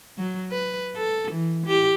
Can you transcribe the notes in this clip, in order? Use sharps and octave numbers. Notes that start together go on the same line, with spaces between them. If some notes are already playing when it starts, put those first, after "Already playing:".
F#3
B4
A4
E3
G4